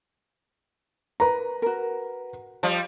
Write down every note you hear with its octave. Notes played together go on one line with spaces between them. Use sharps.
A#4 B4 A#5
F#4 A#4
F3 G3